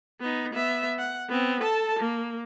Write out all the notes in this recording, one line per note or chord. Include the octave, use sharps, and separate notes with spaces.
B3 D#4
B3 E5
F#5
B3 C4
A4 A5
A#3